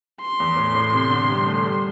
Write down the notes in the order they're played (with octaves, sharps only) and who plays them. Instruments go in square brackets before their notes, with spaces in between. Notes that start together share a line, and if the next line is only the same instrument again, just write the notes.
[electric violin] C6
[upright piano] E2
A2
A2
C3
D3
G3
A3
G3